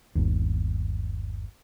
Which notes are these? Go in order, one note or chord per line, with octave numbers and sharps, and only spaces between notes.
G1 D#2